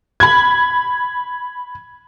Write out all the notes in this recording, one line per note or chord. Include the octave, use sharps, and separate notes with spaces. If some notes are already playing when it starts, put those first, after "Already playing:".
B5 G#6